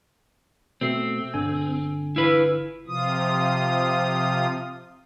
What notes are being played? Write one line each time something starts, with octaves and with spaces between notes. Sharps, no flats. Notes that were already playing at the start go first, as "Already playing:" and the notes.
B2 A3 C4 C7
G1 D3 G#5
E4 F4 B4
C3 F3 F4 D#6